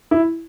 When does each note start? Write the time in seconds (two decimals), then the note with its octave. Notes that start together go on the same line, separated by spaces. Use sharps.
0.11 E4